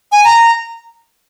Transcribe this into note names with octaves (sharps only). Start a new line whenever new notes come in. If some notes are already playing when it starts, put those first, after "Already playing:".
G#5
A#5